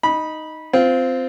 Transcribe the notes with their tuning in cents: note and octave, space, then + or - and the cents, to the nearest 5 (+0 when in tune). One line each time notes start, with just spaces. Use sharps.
D#4 +0 B5 -15
C4 -15 F4 +0